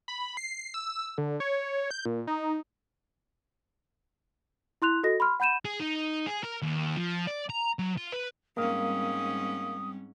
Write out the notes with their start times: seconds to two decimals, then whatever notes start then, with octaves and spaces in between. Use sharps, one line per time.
0.08 B5
0.37 C7
0.74 E6
1.18 D3
1.40 C#5
1.91 G6
2.05 A#2
2.27 D#4
4.82 E4 C6 F#6 F7
5.03 F#4 A4 D#5 A#6
5.20 B5 C6 F6
5.40 F#5 B5 G6 D#7 E7
5.65 G#4
5.80 D#4
6.27 G#4
6.43 A#4
6.62 D#2
6.97 F3
7.27 D5
7.50 A#5
7.79 F#3
7.97 F4
8.13 B4
8.57 G#2 G3 A#3 C4 C#4 A#4 F5 D#6